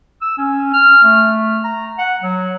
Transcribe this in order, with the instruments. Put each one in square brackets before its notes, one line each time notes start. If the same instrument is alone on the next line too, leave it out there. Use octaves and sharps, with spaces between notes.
[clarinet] E6
C#4
F6
A3
A#5
F#5
F#3